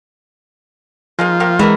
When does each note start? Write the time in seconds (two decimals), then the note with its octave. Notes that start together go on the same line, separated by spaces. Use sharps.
1.19 F3 G#3 A#3 D#4
1.40 A#3 G4 E5
1.59 C3 E3 G#3 F#4 A#4